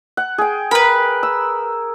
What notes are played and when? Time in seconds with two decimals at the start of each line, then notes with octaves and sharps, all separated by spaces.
0.17 F#5
0.38 G#4 G5
0.71 A#4 B4 B5
1.23 E6